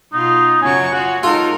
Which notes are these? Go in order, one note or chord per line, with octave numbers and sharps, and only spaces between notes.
B2 D#4 F4
F#2 C#3 F#3 C#4 G#5 C#6
F4 F#4 C#5 F#5
G#3 D#4 F4 A4 A#4